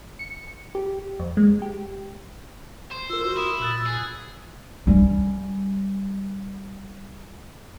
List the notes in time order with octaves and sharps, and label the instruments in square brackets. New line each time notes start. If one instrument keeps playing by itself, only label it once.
[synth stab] C#7
G4
F2
G#3
G4
[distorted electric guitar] C5
[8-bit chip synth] F4 A#4 [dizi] E6
[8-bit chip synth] F#4 A#4 C6
[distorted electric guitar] E4 [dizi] D#6
[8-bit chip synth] A#2 F#6 A6 [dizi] E6
[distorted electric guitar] G#4
[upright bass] G3 C#4